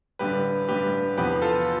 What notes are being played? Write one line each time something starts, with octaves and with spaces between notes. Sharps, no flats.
A1 G2 D3 G4 B4
A1 G2 D3 G4 B4
E2 C3 F3 B3 G4 B4
F4 A4